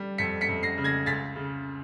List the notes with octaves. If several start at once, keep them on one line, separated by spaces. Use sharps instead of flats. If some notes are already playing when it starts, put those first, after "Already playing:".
Already playing: G3
F2 B6 C#7
B6 C#7
F2
A#6 C7
C#3
G#6 A#6
C#2 A6 B6
C#3